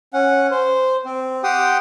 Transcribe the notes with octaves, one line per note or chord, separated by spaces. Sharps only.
C#4 F#5
C5
C4
G4 F#5 G5 C6 D#6